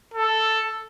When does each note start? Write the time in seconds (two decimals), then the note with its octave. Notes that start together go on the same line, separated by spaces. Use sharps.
0.14 A4